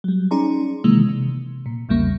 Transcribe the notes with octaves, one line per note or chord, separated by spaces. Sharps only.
F#3 G3
C#4 D#4 G#4 D5 A#5 C6
C3 D#3 E3 G#3 A#3
C3
A#2
A#1 E2 C#3 G3 A#3 C#6